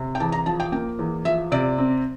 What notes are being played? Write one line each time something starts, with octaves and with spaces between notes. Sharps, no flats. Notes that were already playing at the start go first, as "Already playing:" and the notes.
Already playing: C3
G5
E2 A5
A#5
F3 A5
G5
A#3 G5
E2
F3 E5
C3 D5
C4